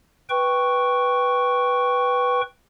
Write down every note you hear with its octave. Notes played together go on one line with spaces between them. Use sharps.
B4 G5 C#6